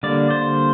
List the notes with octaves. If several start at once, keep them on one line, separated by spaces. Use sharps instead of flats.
D3 G3 A#3 D5
C5